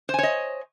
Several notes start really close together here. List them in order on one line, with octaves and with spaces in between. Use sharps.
C5 G#5 C#5 D#5